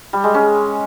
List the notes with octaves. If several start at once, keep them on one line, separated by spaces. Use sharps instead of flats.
G3
G#3
C#4